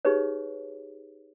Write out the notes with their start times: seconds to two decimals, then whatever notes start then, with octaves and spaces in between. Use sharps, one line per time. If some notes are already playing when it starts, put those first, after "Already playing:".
0.05 D#4 G4 G#4 B4 C#5